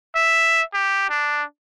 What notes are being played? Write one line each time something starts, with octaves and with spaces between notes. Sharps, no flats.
E5
G4
D4